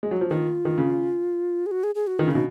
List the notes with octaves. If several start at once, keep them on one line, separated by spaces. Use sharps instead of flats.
G#3
F#3
F3
D#3 F4
D#3
C#3
G#4
F#4
G#4
G#4
F#4
D#3 F4
C#3
B2 D#4